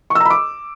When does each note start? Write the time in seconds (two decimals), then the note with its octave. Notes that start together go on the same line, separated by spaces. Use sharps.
0.10 C#6
0.15 E6
0.20 A#5
0.25 B5
0.30 D6